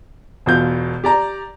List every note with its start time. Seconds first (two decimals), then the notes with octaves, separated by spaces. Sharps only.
0.46 E1 B2 F4 G6
1.04 G4 D5 A#5